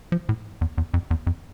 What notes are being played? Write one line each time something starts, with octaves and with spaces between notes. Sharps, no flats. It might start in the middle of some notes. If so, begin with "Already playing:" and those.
F3
A2
E2
E2
F2
E2
F2